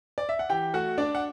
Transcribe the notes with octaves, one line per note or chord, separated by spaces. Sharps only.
D5
E5
F#5
E3 G4 G5
A3 F#4 F#5
D4 D5
F#5